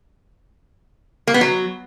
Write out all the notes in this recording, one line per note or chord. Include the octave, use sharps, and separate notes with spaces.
A#3
B3
F#3